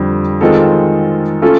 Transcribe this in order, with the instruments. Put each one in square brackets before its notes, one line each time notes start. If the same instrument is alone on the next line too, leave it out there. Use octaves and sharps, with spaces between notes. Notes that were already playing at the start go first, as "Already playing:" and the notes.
Already playing: [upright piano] F2 D3 G3
D#3 G#3 C4 F4 A4
A3 C#4 F4 A4